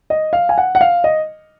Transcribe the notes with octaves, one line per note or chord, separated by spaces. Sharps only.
D#5
F5
G#5
F#5
F#5
F5
D#5